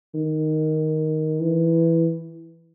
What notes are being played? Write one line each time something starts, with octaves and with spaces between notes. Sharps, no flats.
D#3
E3